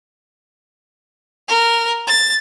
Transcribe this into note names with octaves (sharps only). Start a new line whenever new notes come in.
A#4
A6